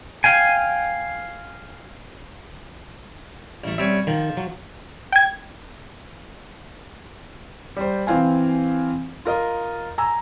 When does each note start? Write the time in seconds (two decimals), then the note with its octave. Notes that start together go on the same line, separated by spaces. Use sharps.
0.24 F5 G5 G#5
3.64 A1 A3
3.78 G3 C4 C#4 E5
4.07 D#3 F3
4.37 F#3
5.12 G5 G#6
7.77 G3 C5
8.07 E3 C4 F5 G#5
9.25 F4 A#4 D#5
9.98 G#5 A#5 E6